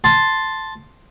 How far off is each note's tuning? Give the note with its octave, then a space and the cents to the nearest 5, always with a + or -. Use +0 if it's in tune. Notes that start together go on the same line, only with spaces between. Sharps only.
A5 +0 C6 +0